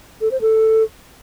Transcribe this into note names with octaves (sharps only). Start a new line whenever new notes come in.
A4
C5
A4